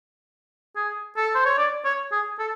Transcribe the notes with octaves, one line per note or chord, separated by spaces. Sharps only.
G#4
A4
C5
C#5
D5
C#5
G#4
A4